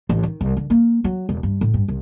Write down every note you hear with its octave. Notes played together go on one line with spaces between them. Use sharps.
A1
D#3
C2
D3
A#3
F#3
E1
G2
A2
G2
C2